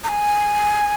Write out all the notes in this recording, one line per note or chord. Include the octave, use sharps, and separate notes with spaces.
A#5
G#5